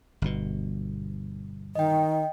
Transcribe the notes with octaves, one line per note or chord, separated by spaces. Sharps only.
G1 B2
D#3 D#5 G5